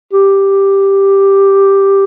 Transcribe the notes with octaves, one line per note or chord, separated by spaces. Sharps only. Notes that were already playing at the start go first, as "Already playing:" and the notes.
G4